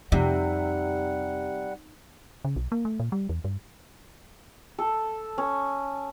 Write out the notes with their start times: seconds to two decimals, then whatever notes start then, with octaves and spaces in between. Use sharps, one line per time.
0.12 F2 C3 G3 D#4 F#5
2.45 C#3
2.56 B1
2.72 A#3
2.85 A3
3.00 A#2
3.12 G3
3.29 E2
3.44 G2
4.78 A4
5.38 C#4